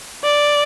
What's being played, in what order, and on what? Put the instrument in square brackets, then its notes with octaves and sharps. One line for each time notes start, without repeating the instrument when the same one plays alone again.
[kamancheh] D5